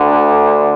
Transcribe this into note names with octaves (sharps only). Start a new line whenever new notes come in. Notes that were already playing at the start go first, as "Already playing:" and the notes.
Already playing: D2 D3